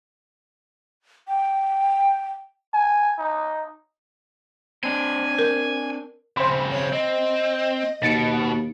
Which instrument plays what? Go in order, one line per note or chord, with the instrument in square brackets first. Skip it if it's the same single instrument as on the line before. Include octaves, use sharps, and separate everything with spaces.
[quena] G5
[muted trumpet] G#5
D#4
[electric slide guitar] C4 D4 [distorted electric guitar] G#5
[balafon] A#4
[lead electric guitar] C#3 C4 [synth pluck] C5 B5
[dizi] C#5
[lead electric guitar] C4 [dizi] D#5
[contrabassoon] D#2 [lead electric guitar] B2 [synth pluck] A6 C#7 D7